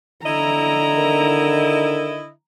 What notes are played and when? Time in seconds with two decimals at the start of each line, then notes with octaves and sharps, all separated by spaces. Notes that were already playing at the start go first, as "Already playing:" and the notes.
0.24 D3 E4 D#5 A#5
0.98 D#3